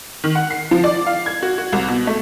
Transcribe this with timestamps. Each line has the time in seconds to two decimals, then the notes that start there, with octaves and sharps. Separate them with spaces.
0.24 D#3
0.35 F#5
0.50 C7
0.71 F3
0.84 D5
1.06 F5
1.26 G#6
1.43 F#4
1.58 F#4
1.72 C2
1.88 B2
2.07 A3